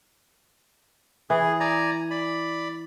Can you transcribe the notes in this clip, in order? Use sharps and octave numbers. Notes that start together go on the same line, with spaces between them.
E3 G#4
D5 G#5 A#5
D5 B5